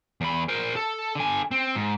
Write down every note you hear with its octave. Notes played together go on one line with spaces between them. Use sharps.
E2 B5
A#4 C5
A4
D3 G#5
C4
G#2